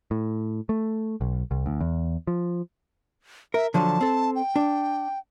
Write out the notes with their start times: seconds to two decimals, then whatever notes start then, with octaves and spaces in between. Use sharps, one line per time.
0.11 A2
0.69 A3
1.21 B1
1.51 C2
1.66 D2
1.80 E2
2.27 F3
3.54 A#4 E5
3.74 D3 F3 F#3 A5
4.01 C4 A4
4.36 G5
4.56 D4